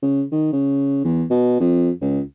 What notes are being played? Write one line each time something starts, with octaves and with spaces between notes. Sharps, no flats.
C#3
D#3
C#3
E2
B2
F2
C#2